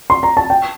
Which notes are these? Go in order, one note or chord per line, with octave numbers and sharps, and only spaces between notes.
C6
A#5
A5
G5